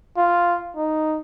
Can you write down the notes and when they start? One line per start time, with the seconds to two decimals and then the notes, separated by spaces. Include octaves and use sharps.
0.17 F4
0.76 D#4